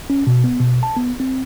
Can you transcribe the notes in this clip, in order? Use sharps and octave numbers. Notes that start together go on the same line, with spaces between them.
C#4
B2
B3
B2
A5
B3
C4